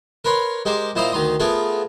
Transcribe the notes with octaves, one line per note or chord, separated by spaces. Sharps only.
A#4 B4 C#5 C6
G#3 G4 A#4 C5
A#2 E4 C5 D#5 F5 A#5
D2 D#3 A#5 C6 D#6
A3 B3 F4 G#4 A#4